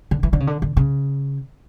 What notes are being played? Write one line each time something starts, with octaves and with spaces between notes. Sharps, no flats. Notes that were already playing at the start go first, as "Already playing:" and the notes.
D3
E3
D3
C#3
D3
D3
C#3